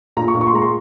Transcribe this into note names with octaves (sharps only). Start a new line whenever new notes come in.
A#2 A#5
C#6
A#2
C#6
C6
G#3 A#5
C6